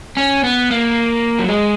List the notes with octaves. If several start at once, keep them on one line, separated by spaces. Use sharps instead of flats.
C#4
B3
A#3
F#3
G#3